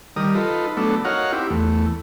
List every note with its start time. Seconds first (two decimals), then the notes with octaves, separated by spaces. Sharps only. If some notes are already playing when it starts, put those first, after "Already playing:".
0.16 D#3 G3 A#4 D#6
0.35 D#4 F4 A4 B4
0.77 F#3 A3 B3 D4 A4
1.05 D#4 F#4 A#4 C#5 F5 F#5
1.32 C4 E4 G4
1.50 E2 A3